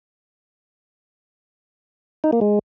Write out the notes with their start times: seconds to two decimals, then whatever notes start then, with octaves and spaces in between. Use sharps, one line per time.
2.24 D#4
2.33 A#3
2.41 G#3